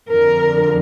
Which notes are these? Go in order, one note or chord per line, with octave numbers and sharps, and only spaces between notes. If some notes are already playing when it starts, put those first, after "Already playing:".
F2 D3 F3 A#4